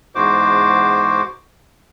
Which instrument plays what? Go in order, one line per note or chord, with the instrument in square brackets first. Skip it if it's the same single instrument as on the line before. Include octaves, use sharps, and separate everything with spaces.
[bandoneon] E2 G#2 F#4 C5 D6